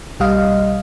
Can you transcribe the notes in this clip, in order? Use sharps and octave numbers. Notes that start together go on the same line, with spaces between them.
B1 G3 D#5 F5